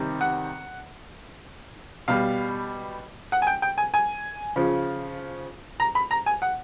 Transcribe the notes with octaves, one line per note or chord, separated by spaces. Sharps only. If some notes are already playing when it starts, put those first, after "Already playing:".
Already playing: C3 D#3 G3
F#5
B2 G3 F5
F#5
G#5
G5
G5
G#5
G#5
C#3 F3
A#5
B5
A#5
G#5
F#5